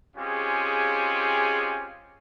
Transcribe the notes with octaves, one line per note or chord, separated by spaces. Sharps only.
G#3 C4 C#4 F4 G4 G#4